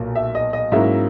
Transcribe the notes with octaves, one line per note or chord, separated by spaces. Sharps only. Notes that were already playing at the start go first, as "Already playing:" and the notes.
Already playing: B1 A#2 A#3
E5
D#5
D#5
G#2 F#3 A#3 C#4 E4 E5